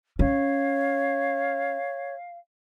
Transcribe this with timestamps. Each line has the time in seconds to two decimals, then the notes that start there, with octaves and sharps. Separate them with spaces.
0.19 C#4 C#5 F5